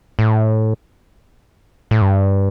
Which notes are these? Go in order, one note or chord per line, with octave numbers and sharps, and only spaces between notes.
A2
A2
G2